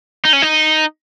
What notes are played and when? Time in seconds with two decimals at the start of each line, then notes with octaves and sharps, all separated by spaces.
0.25 D#4
0.33 C#4
0.42 D#4